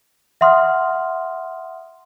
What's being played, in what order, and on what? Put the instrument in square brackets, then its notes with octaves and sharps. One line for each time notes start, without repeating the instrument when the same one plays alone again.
[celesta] E5 F#5 C6 D#6 F6